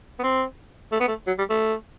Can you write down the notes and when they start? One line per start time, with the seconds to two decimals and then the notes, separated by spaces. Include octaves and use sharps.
0.19 B3
0.23 C4
0.92 A3
1.00 B3
1.08 A3
1.27 F#3
1.38 G3
1.50 A3